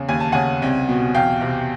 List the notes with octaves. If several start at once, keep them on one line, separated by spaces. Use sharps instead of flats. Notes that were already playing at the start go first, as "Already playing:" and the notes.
Already playing: E2 C#3
D#2 G#5
A5
C#3 F#5 G#5
C2
B2
E2 F5 G5
C3